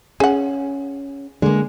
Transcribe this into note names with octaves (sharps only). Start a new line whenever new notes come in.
C#4 G#4 F#5
D3 G#3 A#3